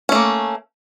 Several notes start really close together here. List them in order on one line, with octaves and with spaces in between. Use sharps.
C#4 A3 A#3